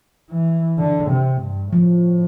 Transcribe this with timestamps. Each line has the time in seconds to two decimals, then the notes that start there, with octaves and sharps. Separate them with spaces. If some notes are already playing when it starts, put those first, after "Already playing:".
0.31 E3
0.79 D3
1.10 C3
1.41 G2
1.73 A2 F3